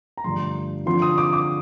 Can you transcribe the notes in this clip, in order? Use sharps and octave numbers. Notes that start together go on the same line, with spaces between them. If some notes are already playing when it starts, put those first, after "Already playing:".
A#5
G2 D3 F3 A3 C6
D3 F3 C4 F4 C6
D#6
D6
D6